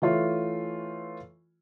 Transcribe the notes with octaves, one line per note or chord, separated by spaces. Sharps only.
E3 A3 F4 C#5